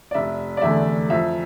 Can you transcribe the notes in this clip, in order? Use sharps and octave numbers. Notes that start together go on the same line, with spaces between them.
D5
F1 E5
D5
E2 D3 A3 E5
F2 E5